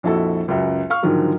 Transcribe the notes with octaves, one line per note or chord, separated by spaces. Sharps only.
A#1 F2 E4 F#4 A4
C#2 F#2
F5 C#6 F6
G#2 D3 D#3 F3 F#3